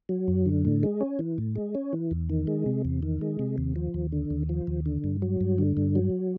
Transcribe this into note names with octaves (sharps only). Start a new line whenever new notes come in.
F#3
F#2
D3
A2
G#3
C#4
E3
A2
G#3
C#4
E3
E2
D#3
G#3
C3
E2
D#3
G#3
C3
D#2
F3
D#2
D3
D#2
F3
D#2
D3
G2
F#3
G2
D3
G2
F#3